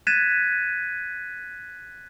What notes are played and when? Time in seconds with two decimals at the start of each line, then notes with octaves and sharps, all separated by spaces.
0.07 F#6 G#6 A6 B6 D#7 E7